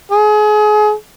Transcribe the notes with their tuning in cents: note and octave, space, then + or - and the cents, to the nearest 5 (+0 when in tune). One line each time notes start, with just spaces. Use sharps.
G#4 +30